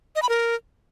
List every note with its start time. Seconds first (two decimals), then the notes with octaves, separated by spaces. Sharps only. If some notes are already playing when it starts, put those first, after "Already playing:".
0.16 D#5
0.22 B5
0.29 A#4